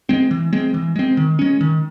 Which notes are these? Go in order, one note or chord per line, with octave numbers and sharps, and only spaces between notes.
G#3 C4
E3
G#3 C4
E3
G#3 C4
D#3
G#3 C#4
D#3